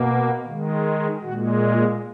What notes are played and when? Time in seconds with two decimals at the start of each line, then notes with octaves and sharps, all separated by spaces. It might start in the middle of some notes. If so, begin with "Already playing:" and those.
Already playing: B2 A#3
0.45 D#3 G#3
1.22 A#2 G#3 F#4
1.61 F4